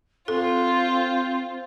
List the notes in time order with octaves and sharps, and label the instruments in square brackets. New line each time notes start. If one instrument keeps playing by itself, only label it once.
[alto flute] C4 [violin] F4 [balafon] A4 [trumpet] C5